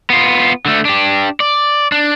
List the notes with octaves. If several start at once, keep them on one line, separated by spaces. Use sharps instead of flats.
B3 F4
D3 A3
D4 G4
D5
D4